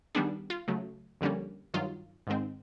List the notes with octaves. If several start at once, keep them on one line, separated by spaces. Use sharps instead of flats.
D#3 G3 B3 D4 G#4
F4
C#3 F#3 A3
F2 D3 G3 A#3 C#4
G2 D#3 F#3 F4
G#2 D#3 G#3 C4